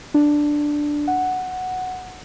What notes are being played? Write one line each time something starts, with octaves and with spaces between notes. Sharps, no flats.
D4
F#5